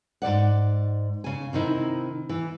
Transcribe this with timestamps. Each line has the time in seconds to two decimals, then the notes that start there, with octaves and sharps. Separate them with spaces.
0.22 G#2 C#3 D5 F#5
1.24 C#3 G#5
1.53 C3 D#3 D#4 E4
2.29 E3